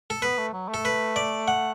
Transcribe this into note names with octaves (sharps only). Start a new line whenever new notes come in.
A4
B3 B4
A3
F#3
A3
A4
B4
D5
F#5